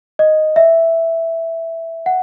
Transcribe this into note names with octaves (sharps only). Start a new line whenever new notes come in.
D#5
E5
F#5